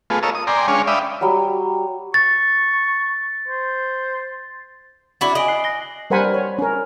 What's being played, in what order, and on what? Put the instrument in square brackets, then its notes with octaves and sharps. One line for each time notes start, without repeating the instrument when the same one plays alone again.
[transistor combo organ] A3 B3 F4 G#4
A4 A#4 C#5 D#5 F5 E6
D#6
D5 G5 G#5 A#5 C6
G#3 C#4 D4 C#5 F5 G#5
D5 E5 F5 G5 B5 D#6
[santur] F#3 G3
[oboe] C#6 [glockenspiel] A6
[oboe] C5
[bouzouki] D4 E4 F#4
[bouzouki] D#5 [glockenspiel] G#5 D7 F#7
[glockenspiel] F#6 C7 G7
A#6 G7
[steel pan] G3 A#4 C5 F#5 G#5 B5
C#5
C#4 A#4